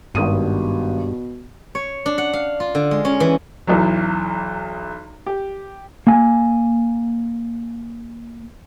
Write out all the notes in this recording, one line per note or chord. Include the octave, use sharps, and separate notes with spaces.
G#1 G2 B2 D#6 D#7
C#5
D4
F#5
F5
F4
D3
G#3
C#4
E3
B1 E2 E3 F#3
G4
A#3 G#5